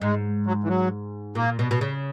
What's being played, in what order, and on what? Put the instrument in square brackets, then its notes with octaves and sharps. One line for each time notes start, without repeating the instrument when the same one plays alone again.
[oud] G#2 [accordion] G#3
[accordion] F#3
E3
F#3
[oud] A#2 [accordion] A#3
[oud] B2
B2
C#3